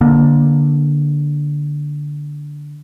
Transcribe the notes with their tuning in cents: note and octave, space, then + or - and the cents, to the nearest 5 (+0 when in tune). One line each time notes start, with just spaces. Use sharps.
D3 +0 A#3 +20